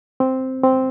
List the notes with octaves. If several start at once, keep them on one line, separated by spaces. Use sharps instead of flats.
C4
C4